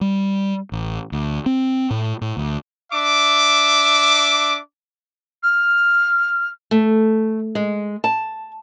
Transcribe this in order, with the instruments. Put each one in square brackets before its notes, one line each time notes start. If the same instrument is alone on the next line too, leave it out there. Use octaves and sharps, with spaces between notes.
[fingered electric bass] G3
A1
D2
C4
A2
A2
D2
[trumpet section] D4 E5 D6
[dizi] F6
[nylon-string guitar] A3
G#3
A5